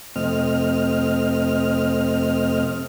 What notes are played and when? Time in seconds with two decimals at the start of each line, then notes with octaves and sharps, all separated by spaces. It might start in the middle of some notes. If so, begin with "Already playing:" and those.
0.16 F2 C3 A3 C4 D#5 F6